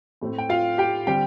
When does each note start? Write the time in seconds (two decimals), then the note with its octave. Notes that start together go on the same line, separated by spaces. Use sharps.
0.21 A2 A3 C4
0.38 G5
0.49 F4 F5
0.78 G4 G5
1.07 D3 G3 C4 G4 G5